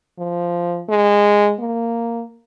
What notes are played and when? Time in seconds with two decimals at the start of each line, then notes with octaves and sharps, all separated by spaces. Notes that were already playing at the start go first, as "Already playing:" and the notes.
0.19 F3
0.89 G#3
1.60 A#3